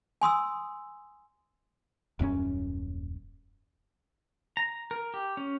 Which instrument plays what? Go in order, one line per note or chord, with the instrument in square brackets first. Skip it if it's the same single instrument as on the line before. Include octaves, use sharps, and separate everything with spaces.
[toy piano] G#5 C6 D#6 E6
[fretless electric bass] D#1 F#2 G3 C#4
[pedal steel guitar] A#5
A#4
G4
C#4